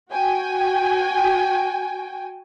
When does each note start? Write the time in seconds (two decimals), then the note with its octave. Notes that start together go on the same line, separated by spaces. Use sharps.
0.11 F#4 G5 G#5